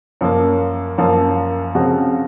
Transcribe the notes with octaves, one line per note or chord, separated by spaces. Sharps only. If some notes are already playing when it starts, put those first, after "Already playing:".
F#2 F3 A#3
F#2 F3 A#3
C#3 F3 C4 F#4